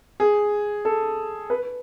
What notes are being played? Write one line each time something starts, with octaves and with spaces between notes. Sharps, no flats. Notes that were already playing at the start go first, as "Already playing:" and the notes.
G#4
A4
B4